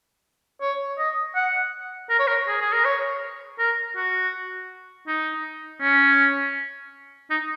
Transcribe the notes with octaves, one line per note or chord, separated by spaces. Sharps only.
C#5
D#5
F#5
A#4
C#5
A#4
G#4
G#4
A#4
C#5
A#4
F#4
D#4
C#4
D#4